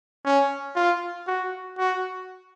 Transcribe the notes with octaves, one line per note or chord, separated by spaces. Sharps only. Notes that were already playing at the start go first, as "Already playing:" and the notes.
C#4
F4
F#4
F#4